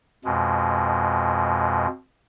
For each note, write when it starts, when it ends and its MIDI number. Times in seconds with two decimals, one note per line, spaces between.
0.25 1.87 41
0.25 1.87 47
0.25 1.87 56